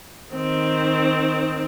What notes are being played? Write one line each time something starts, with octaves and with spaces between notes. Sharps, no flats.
D#3 C4